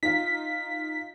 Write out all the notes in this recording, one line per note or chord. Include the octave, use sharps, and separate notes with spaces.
D#4 F4 B6